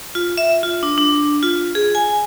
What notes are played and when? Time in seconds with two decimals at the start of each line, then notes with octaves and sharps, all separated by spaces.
0.15 F4
0.38 E5
0.63 F4
0.83 D4
0.98 D4
1.43 F4
1.75 G#4
1.95 G#5